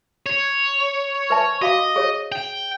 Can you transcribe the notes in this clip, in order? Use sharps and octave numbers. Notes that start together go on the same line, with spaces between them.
C#5
B4 E5 A5
F#4 D#5 F5 D6
G#4 C#5
G5